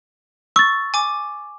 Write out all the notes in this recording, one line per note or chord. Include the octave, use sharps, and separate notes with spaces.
C#6 E6 A6
G#5 D6